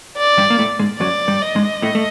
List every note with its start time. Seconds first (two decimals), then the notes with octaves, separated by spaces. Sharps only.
0.18 D5
0.38 G2 G3
0.50 A#3
0.59 A2 A3
0.79 G#2 G#3
1.00 F#2 F#3 D5
1.28 G2 G3
1.42 D#5
1.55 G#2 G#3
1.82 A2 A3
1.95 A3